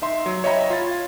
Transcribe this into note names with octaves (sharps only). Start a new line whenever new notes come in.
D#4 E5 C6
F#3
C#5 D#5 E5 G5 A#5 B5
F4 A6
G#6